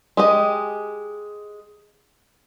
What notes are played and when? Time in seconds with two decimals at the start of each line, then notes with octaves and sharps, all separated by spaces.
0.17 G#3 G4 D#5